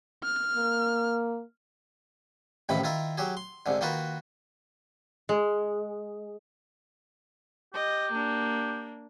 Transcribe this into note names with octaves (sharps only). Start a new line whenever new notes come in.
F6
A#3
A1 A2 C3 D#3 F3 B5
D#3 E4 F4 A#4
F#3 G4 G#4
C6
C2 G#2 D3
D#3 A#3 D#4 F4 F#4 B4
G#3
G4 D#5
A#3 D4